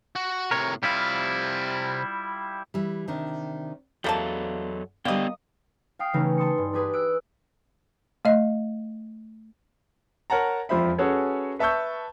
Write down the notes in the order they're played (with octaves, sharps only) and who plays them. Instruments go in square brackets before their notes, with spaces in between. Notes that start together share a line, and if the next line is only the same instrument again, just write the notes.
[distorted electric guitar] F#4
[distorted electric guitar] A2 C3 [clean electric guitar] A#4 C#5
[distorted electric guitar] C3 F5 [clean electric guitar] G3 E4 F4
[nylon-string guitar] E3 G3
C3 D#3 D4
[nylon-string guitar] E2 B4 D5 [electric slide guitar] F#3 A4 [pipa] G3 A#3 A5
[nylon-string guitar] D3 G3 [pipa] A#3 D#5 [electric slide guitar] B3 D5 G5
[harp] F5 G5 D#6 C7
C#3 E3 A3 C#4 D#4
G#5 A5 C6 D#6 C#7
G2
D4 G4 G#4 B4
E6 F#6 D7
[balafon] A3 D#5
[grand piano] A#4 C#5 F#5 A5 A#5
E1 F2 F3 C5 E5 B5
C#4 F#4 G#4 A4 B4 C#5
B4 E5 A5 C#6 E6 G6